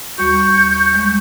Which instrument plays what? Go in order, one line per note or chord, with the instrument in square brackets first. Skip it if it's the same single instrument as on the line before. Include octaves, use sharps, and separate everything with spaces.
[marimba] D#2 G3 F#4 [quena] C#6 [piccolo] G6
[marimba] G3 G#3